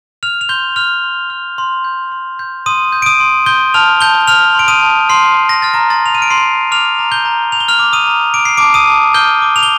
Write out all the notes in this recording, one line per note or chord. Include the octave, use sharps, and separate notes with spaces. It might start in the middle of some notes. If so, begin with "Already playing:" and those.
F6 F7
F7
C6 G6 G7
F6 F7
C6
F6
C6
G6
C6
G6
C6 D#6 D#7
G6
D7
D#6 D#7
C6
C6 G6 G7
A5 F6 F7
A5 G6 G7
F6 F7
C6 D7
D#6 D#7
A5
C6 F6 C7
C6
A#6
F6 A6
A#5 A#6
C6 A6
F7
D#7
F6 D7
C6 C7
C6
D6 F6 F7
A#5
G6 G7
A#5
G6 F7
G7
F6 F7
D6
D#6 D#7
A#5
D6 D7
C7
A5 D6 D7
D#6 D#7
A5
F6 G6 G7
D6
F7
G7